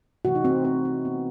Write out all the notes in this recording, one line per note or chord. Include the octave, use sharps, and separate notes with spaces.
C3 E3 A3 F#4
D#4
C4
C4
C4
B3